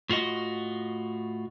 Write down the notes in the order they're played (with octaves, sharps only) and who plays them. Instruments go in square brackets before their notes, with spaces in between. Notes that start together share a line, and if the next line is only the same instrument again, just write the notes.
[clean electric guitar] A2 F4 F#4 D#5